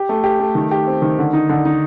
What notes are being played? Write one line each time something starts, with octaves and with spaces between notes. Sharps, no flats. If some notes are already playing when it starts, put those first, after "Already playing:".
Already playing: G4
A3
G4
A3
D#3
G4
C4
D#3
D3
D#4
D3
D#4